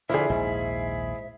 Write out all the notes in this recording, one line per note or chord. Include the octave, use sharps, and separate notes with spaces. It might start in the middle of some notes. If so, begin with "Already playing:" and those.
D3 F3 E4 G#4 E5
A#1 D#2 G#2 D#3